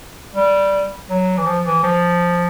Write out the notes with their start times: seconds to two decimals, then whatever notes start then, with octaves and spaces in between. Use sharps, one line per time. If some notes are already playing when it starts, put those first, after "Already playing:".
0.36 G3
1.10 F#3
1.37 E3
1.47 F3
1.66 E3
1.84 F3